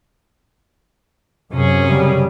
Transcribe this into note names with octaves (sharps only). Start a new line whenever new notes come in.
F#2 C3 C#4 G#4
C#3 G3